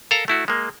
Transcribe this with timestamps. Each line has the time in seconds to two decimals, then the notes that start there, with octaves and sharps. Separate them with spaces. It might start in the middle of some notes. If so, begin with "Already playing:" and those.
0.11 A4 A#4 F5 A#5
0.28 A3 E4 F#4
0.48 G#3 A#3